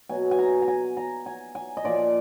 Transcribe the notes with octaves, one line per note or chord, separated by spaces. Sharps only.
B2 F#3 G#5
G#5
A#5
A#5
G#5
A#5
G#5
G#5
D#5
A#2 F3 D5